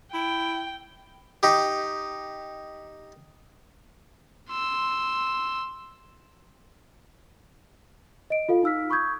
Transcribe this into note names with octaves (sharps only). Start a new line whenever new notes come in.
E4 G5
D#4 G4
C6 E6
D#5 D7
F4 A4 F5
D#4 F5 E6 F6 B6
B5 C#6 D#6 G6 G#6